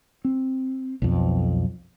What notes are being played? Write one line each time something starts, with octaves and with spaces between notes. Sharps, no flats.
C4
B1 F2